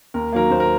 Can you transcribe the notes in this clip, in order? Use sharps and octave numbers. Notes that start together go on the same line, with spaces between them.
D#2 A#4
D#3 F#3 A#3 A#4
D#2 C5
A#4